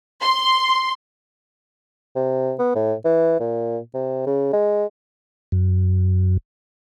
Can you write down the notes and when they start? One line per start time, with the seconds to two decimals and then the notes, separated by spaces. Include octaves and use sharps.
0.23 C6
2.16 C3
2.59 B3
2.75 A2
3.05 E3
3.40 A#2
3.94 C3
4.26 C#3
4.53 G#3
5.52 F#2